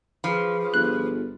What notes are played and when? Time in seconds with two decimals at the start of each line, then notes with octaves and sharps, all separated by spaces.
0.24 F3 G#4 B4 B5
0.74 G1 F#6